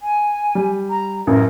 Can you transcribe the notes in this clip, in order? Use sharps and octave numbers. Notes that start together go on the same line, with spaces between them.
G#5
G3
A#5
A1 F#2 A#4